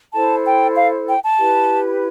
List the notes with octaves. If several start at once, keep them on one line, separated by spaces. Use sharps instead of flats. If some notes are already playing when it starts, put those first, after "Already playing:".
E4 A4 C5 A5
G5
F5
G5
A5
E4 G4 B4